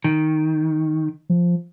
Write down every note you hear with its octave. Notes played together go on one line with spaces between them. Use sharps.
D#3
F3